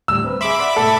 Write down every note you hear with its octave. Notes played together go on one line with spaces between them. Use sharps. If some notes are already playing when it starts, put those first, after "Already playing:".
D2 A2 G3 E6
C4 B4
G#4 E5 B5 C6 D6
D5 F#5
G#2 B2 A3 A4